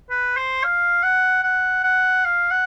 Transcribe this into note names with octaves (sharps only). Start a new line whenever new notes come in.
B4
C5
F5
F#5
F#5
F#5
F5
F#5